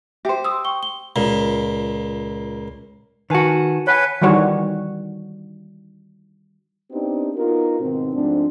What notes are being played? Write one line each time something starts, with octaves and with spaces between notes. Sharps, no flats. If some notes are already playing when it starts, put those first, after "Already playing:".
G4 C5 E5 G5
C6 D#6 E6
G5 C#6 G7
G7
C#2 A#2
D#3 F#4 B4 G#5 A5
B4 C#5 F#5 G#5
D#3 E3 G3 F#4 C#5
B3 C4 D4 D#4 G4
B3 D#4 F4 F#4 A#4
G#2 B2 D#3 C4
G#2 F3 A3 C4 D4